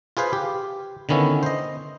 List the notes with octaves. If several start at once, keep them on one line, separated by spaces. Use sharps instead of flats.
F4 G#4 B4 C5 F5
G4
D3 D#3 B3 C#4 E4
C5 D#5